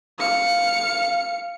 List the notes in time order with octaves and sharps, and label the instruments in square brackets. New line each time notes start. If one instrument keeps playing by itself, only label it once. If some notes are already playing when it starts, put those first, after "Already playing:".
[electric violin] F5 C#7